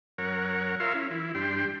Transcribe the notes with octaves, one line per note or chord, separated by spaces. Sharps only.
F#2 A#4 C#5 F#5
F4 A#4 C#5 E5 F5 C6
C#4 E4
E3 E4
G2 D4 G4 G5 C6